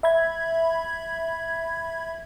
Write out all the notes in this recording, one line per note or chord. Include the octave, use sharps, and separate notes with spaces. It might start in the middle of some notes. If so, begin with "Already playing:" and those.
E5 B5 G#6